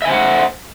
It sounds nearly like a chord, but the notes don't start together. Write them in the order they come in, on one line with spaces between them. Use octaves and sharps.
E5 G#5 C5 F#5